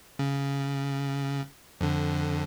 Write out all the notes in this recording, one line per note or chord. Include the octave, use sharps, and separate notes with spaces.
C#3
F2 D3